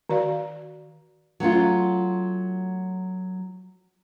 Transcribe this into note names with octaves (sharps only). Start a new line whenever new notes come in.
D#3 F#4 D5 F5
F#3 A3 C#4 F4